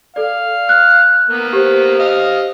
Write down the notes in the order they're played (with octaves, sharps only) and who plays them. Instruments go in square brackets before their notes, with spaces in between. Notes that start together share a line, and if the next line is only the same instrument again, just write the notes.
[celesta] A4 D5 [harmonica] F5
[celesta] F6 F#6
[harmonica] A#3 B3
[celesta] G4 C5
[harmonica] D#5 F5